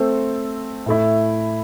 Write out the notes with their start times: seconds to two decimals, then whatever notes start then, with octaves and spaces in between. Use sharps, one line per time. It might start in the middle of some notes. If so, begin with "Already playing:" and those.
Already playing: A3 C4 A4 C5
0.86 A2 A3 E4